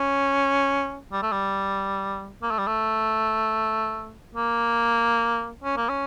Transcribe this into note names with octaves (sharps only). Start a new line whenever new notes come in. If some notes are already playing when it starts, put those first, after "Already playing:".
Already playing: C#4
G3
A3
G3
A#3
A3
G3
A3
A#3
C#4
A#3
C#4